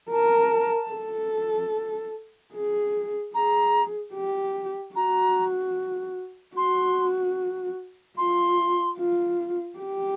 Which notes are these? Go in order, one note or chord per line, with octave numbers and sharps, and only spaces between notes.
A#4 A5
A4
G#4
G#4 A#5
G4
F#4 A#5
F#4 C6
F4 C6
F4
G4